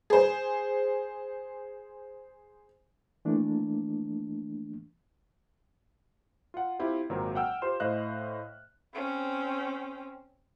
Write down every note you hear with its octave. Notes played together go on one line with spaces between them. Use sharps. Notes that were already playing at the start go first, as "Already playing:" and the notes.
G#4 C5
E3 A3 A#3 D4
F4 F#5
C4 E4 F4 G4
G#1 A#2 F#3 C4 A#4
F#5 G5 E6 F6
F4 G4 C5 C6 E7
A2 C5 D#5 F5 F#6
C4 C#4